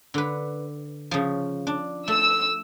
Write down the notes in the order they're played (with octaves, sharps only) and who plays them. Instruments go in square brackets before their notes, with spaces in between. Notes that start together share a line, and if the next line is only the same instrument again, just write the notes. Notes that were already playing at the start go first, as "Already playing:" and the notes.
[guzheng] D3 B4
C#3 F3
D4
[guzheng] A3 [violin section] E6